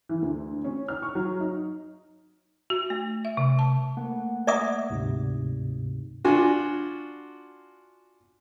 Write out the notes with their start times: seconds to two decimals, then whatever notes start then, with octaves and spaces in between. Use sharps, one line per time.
0.09 E3
0.22 D2
0.64 C#4
0.88 F6
1.02 C#6
1.15 F#3
1.40 D#4
2.70 F#4
2.90 A3
3.25 E5
3.37 C3
3.59 A5
3.97 A3 A#3 F#5
4.47 D5 E5 D#6
4.90 D2 G#2 C3
6.24 D4 F4 F#4 G#5